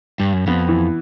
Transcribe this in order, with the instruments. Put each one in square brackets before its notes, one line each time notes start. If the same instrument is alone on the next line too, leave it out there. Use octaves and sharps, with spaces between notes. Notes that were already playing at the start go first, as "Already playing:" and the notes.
[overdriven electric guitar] G2
F#2
[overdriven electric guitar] F2 [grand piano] B3
[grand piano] E3